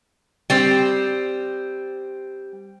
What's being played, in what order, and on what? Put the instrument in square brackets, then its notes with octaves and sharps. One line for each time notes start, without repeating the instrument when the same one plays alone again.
[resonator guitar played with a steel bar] G3 C4